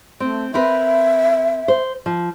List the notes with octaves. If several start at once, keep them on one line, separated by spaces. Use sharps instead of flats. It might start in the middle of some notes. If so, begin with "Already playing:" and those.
A3 C4
C4 A#4 B4 E5
C5
F3